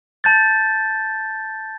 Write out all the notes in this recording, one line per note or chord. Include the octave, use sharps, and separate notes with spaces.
A5 G6 A6